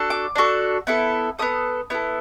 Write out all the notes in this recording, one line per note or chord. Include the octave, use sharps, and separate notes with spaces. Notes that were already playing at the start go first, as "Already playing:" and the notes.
Already playing: D4 F#4 A4
D6
D4 F#4 A4
B3 E4 A4
B3 E4 A4 D#6
B3 E4 A4